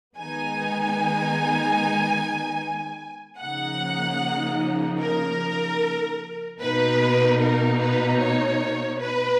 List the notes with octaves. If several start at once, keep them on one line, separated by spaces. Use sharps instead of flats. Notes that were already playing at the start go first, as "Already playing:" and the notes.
D#3 G#3 B3 D#4 G#5
C#3 F3 A#3 D#4 F#5
A#4
B2 A#3 D#4 B4
A#4
B4
C#5
B4